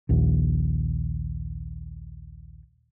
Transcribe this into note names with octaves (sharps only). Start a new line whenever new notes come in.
A#1 D#2